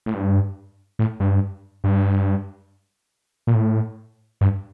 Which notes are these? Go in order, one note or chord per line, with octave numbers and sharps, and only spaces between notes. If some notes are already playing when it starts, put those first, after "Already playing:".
A2
G2
A2
G2
G2
A#2
A2
G2